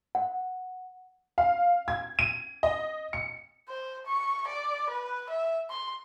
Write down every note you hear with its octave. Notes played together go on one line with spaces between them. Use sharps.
F#5
F5
G#6
D#7
D#5
C#7
C5
C#6
D5
B4
E5
C6